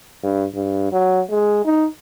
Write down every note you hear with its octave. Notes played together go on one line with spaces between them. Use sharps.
G2
G2
F#3
G#3
D#4